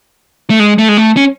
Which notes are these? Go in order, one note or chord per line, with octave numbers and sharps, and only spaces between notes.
A3
G#3
A3
G#3
A3
C#4